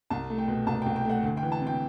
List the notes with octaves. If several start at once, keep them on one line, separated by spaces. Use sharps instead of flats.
C2 A5
A3
G5
B2
C2 A5
C2 G5
G5
A3 F#5
D2
G5
E3
A5
C3
G5